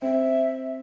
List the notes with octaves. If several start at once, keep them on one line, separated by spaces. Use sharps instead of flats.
C4 E5